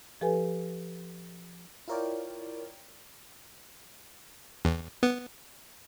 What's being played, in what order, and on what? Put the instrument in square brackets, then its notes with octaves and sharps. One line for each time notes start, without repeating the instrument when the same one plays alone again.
[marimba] F3 G4 A4 B4 G#5
[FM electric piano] E4 F4 A#4 C#5 D5 G5
[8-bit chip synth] E2
B3